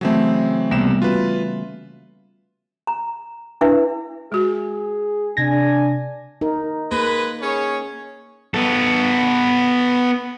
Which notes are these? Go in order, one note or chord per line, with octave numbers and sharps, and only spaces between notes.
C#3 E3 F#3 A3 C4
C2 C3 G3 A#3 B3 E7
C#4 F4 F#4 B4
A#5
D4 E4 B4 E5
G#3 F#4 G#4
C3 D4 G#5 G#6 A#6
D#4 A#4
G#3 A#3 A#4 B4
C#4 G#4 C#5
B3 A4